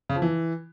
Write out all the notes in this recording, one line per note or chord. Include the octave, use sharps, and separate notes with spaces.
C#3
F3
E3